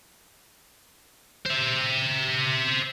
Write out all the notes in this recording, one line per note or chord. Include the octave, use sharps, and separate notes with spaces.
C5 E5